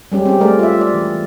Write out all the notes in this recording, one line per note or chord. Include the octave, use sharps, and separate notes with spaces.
G3 G#3 C#4 G4
C4 G4
G#3 A3 G#4 A#4 D5
F4 E5
D5
E3